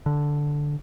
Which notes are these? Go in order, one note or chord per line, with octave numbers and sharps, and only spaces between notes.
D3